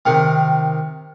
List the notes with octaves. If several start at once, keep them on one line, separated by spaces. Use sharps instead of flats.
C3 D#3